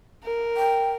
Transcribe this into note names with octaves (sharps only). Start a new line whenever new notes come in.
A#4
G5